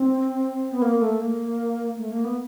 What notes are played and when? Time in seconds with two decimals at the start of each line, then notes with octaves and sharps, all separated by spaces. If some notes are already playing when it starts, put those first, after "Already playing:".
Already playing: C4
0.72 B3
0.82 A#3
1.01 A3
1.20 A#3
1.98 A3
2.11 A#3
2.24 B3